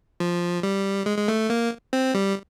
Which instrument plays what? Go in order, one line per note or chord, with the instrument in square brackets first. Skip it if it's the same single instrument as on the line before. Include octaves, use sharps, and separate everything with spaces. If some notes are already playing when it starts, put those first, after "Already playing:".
[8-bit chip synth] F3
G3
G#3
G#3
A3
A#3
C4
G3